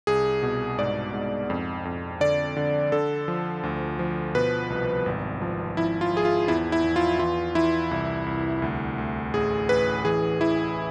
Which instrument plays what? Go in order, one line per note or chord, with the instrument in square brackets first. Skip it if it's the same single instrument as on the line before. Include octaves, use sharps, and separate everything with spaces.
[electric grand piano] C2 G#4
B2
G#2 D5
G#2
F2
F2
D3 D5
D3
D3 A4
F3
D2
F3
B2 B4
C2
G#1
F3
F3 E4
F4
F3 G#4
F4
E2 E4
E4
E2
F4
E3 F4
E3 E4
C2
C2
D2
D2
A1 G#4
A1 B4
E3 G#4
E3 E4